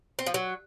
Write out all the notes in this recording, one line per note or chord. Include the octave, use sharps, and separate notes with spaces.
C4
F3
F#3